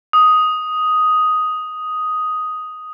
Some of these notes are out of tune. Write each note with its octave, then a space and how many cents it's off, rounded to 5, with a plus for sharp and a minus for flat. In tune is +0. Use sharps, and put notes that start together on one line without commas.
D#6 +5